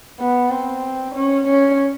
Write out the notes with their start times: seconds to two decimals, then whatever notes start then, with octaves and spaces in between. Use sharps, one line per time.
0.20 B3
0.50 C4
1.15 C#4
1.47 C#4